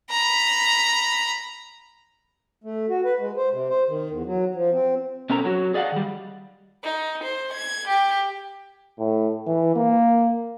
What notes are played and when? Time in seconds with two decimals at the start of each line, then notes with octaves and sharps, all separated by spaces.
0.10 A#5 B5
2.64 A3
2.89 F#4
3.05 B4
3.19 G#3
3.37 C5
3.52 C3
3.70 C5
3.88 D#3
4.10 E2
4.25 F#3
4.55 F3
4.73 C4
5.30 B2 C4 C#4 A4 A#4 A#5
5.45 F#3 F#4
5.74 G#4 D5 D#5 F5 F#5
5.92 D#3 G3
6.84 D#4
7.23 C5
7.53 G#6
7.88 G4
8.99 A2
9.47 E3
9.76 A#3